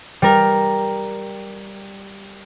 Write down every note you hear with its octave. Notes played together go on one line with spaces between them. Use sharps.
G3 A#4